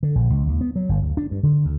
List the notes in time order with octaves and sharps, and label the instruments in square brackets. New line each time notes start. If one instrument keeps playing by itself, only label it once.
[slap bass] D3
A#1
C#2
D#2
B3
F#3
G1
D2
D4
G2
D3
D2